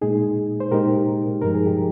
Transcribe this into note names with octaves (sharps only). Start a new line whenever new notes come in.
A#2 G#3 D#4 G#4
C5
A#2 G#3 D#4 G4 A#4
G2 F3 G#3 D#4 A#4
G#4
G4